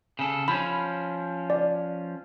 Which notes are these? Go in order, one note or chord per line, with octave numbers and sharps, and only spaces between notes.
C#3 A4
F3 C#4 B5
D5